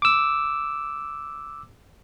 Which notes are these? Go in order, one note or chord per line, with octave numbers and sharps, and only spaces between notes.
D6 E6